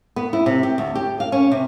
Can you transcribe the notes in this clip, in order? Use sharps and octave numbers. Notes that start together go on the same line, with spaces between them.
B3
E4
C3
G4
D2
G4
F5
C#4
C3